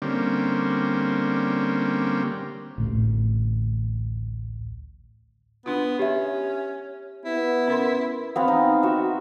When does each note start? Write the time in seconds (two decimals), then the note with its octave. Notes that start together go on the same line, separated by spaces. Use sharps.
0.02 D3 G3 A#3 C4 C#4
2.78 A1 D2 A2
5.66 B3 D4 F4
5.99 C#4 G4 E5
7.25 B3 E4
7.68 C#4 A#4 C6
8.36 B3 C4 F5
8.48 D#4
8.83 F#4 E5